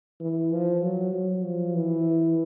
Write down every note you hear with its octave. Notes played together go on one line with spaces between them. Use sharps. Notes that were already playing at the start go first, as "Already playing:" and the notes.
E3
F3
F#3
F#3
F3
E3